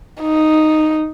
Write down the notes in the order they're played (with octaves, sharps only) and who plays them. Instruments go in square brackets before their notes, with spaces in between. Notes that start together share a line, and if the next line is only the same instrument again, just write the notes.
[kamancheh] D#4